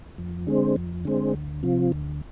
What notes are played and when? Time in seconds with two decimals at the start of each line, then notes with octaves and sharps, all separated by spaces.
0.18 F2
0.47 D3 G#3 C4
0.76 F2
1.05 D3 G#3 C4
1.34 D2
1.63 C3 F3
1.92 D2